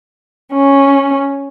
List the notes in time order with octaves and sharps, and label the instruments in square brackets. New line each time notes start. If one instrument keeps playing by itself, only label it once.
[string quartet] C#4